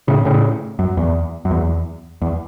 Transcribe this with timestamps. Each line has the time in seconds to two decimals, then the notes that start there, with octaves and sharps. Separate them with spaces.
0.08 A2 C#3
0.25 A2 C#3
0.79 F#2
0.97 E2
1.45 F#2
1.51 E2
2.22 E2